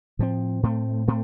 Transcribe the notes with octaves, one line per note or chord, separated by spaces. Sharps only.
A2 F3 C4
A2 A3 C4
A2 A3 C4